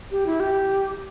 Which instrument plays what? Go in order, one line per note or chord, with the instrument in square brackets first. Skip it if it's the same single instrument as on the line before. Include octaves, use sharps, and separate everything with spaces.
[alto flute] G4
E4
G4